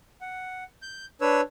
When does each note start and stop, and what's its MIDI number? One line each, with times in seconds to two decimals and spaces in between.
0.21 0.64 78
0.82 1.06 91
1.21 1.41 62
1.21 1.41 71
1.21 1.41 73
1.21 1.41 88